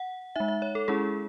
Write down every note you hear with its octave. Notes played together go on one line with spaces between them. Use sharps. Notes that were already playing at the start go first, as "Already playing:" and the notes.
Already playing: F#5
G#3 D#4 E5
E5
C#5
A4
G#3 C#4 E4 G#4